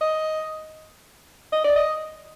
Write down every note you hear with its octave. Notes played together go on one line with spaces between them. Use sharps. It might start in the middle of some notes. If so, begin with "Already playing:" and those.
D#5
D#5
D5
D#5